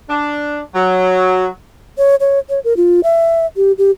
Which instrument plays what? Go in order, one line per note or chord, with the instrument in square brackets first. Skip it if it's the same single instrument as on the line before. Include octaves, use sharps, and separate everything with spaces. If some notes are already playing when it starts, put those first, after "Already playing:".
[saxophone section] D4
F#3
[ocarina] C#5
C#5
C#5
A#4
F4
E5
G4
G4